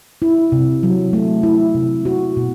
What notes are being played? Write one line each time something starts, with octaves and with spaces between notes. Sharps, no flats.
E4
C3
F#3
A3
E4
C3
F#4
B2